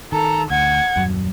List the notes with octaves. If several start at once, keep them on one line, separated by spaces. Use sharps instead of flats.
D#3 A4 A#5
D2 F#5 G#6
D#1 F#2 F#3